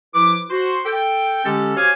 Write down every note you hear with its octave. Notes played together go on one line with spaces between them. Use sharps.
F3 E4 B4 D6
F#4 C5
A4 G5
D3 G#3 C#4 G4 A4
F#4 G4 C5 C#5 F5 G#5